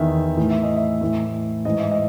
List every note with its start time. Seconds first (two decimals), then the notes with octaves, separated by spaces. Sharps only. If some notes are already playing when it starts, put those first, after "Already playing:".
Already playing: E2 D#3 E5
0.37 A2 E3
0.50 E5
0.63 D#5
0.76 E5
1.01 A2 E3
1.65 G#2 E3 D#5
1.78 E5
1.91 D#5